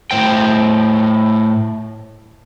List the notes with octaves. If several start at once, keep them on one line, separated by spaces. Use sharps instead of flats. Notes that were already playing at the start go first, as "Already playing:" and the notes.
A2 C5 G5